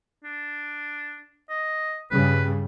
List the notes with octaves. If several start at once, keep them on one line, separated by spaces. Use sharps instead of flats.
D4
D#5
G2 C#3 G3 B4